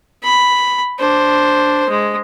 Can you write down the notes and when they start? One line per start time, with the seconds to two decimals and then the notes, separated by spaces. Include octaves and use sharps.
0.24 B5
0.99 D4 C5
1.89 G#3